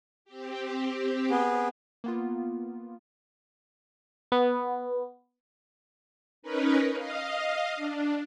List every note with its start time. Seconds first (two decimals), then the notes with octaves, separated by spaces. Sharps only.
0.25 C4 G4
1.30 B3 G#4
2.04 A#3 B3 F4
4.32 B3
6.42 C#4 D#4 A#4 B4
6.95 D#5 F5
7.76 D4